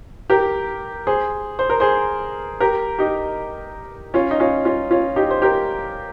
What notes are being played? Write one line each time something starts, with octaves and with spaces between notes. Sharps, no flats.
G4 A#4
G#4 C5
C5
A#4
G#4 C5
G4 A#4
D#4 G4
C#4 F4
D#4
C#4 F4
C#4 F4
C#4 F4
D#4 G4
C5
G4 A#4